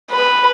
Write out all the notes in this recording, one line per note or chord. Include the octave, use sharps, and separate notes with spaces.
B4